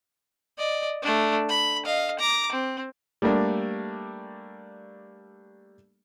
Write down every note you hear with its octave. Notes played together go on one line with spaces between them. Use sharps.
D5 D#5
A3 D4
B5
D#5 F5
A#5 D6
C4
G3 A3 A#3 D4